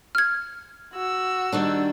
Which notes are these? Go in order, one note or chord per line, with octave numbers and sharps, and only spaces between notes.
F6 G#6
F#4 E6
D#3 G3 D4